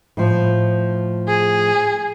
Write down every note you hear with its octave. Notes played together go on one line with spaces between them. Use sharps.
A2 F3
G#4